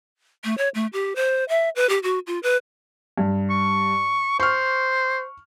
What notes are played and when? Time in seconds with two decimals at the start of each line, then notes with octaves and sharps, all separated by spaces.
0.44 A3
0.58 C#5
0.75 A3
0.93 G4
1.16 C5
1.49 E5
1.76 B4
1.89 G4
2.03 F#4
2.27 F4
2.43 B4
3.18 G2
3.50 C#6
4.40 C5 C#6 F6